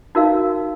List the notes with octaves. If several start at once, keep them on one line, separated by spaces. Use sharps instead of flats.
D#4 F#4 A#4 F5